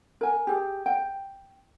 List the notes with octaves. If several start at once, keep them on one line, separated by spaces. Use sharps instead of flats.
A#4 G#5
G4 G#4
G5